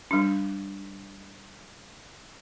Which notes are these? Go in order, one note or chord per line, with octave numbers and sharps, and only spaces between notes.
G3 D4